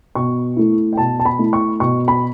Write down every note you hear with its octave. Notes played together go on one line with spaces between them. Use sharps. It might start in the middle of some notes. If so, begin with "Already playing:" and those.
B2 C#6
A3 E4
G5
B2 A5
A5
B5
A3 E4
C#6
B2 C#6
B5